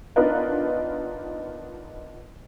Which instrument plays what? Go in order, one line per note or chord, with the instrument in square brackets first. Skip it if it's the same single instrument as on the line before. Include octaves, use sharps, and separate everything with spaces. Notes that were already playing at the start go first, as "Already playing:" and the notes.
[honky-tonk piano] B3 D4 D#4 F4 A#4 B4